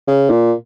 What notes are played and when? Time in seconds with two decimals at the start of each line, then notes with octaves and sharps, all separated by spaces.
0.07 C#3
0.30 A#2